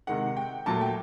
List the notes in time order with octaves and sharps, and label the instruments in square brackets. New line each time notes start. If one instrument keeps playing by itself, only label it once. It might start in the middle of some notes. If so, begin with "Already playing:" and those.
[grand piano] C3 D#3 G#3 F#5
G5
A#2 F#3 A3 A5
G5